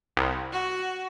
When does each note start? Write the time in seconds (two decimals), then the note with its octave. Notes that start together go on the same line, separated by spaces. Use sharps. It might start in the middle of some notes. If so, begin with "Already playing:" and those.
0.17 C2
0.52 F#4